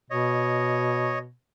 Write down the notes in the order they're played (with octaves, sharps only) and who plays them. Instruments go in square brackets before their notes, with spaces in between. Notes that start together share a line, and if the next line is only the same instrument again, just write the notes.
[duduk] B2 [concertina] C#5 D#5